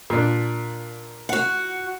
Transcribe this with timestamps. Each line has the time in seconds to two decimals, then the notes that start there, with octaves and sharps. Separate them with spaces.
0.10 A#2 D4
1.29 F#4 F#5